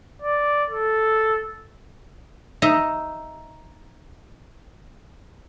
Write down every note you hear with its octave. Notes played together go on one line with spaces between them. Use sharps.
D5
A4
D#4 E5 A#5